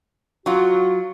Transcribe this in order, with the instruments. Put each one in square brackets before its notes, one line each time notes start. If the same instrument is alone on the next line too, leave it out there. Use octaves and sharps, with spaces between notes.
[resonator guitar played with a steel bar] F#3 F4 [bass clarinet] F#4